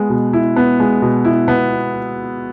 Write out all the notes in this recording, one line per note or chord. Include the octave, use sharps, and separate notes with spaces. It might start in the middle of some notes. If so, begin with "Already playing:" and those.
Already playing: G#3 B3
B2
E4
B3
G#3
B2
E4
B3